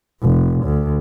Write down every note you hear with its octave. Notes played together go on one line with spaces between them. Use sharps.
F1
D2